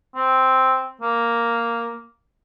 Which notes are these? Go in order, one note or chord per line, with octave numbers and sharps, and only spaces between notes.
C4
A#3